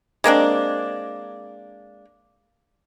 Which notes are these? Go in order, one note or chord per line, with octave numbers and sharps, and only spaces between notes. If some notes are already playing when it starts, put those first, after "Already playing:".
G#3 A#3 C4 D4